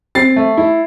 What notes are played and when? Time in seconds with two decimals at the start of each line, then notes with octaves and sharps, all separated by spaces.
0.15 C4 A6 C7
0.36 A3
0.57 E4